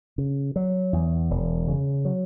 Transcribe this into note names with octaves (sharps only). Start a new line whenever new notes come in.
C#3
F#3
E2
E1
C#3
F#3